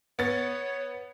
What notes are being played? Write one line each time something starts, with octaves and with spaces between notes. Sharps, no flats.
B3 C#5 A6